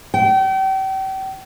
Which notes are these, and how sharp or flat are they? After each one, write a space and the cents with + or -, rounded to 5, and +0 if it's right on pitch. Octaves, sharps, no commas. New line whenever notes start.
G5 -35